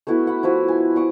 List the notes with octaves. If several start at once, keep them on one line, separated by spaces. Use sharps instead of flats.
A3 B3 E4 F#4
F#5 B5
F3 E4 F#4
G#5
D5 C#6 D#6